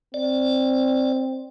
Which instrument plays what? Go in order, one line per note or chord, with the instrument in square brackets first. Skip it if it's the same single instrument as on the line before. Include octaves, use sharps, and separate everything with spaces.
[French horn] C4 [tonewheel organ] D5